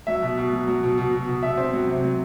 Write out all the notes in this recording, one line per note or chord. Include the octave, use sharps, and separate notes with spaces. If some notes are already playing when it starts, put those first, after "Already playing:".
F#3 E5
B2
B2
F#3
F#3
B2
B2
B2
B2
B2 E5
C4
F#3
C3
F#3